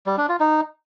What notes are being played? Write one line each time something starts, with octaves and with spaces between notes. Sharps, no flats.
G3
D4
F4
D#4